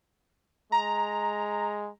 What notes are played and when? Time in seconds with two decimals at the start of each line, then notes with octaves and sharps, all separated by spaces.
0.72 G#3 A#5